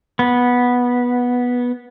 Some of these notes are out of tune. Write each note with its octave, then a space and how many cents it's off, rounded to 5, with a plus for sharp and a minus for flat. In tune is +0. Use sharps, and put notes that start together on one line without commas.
B3 -10